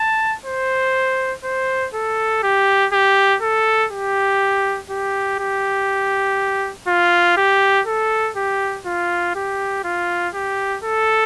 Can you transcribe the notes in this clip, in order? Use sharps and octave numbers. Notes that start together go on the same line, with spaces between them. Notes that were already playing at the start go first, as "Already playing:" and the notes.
Already playing: A5
C5
C5
A4
G4
G4
A4
G4
G4
G4
F4
G4
A4
G4
F4
G4
F4
G4
A4